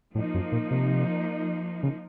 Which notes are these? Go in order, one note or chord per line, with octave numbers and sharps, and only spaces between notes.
A2 F3 A#3 D#4
F#2
A#2
C3
C#3